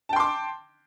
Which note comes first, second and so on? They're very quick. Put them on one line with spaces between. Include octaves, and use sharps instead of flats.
A5 G5 C6 D6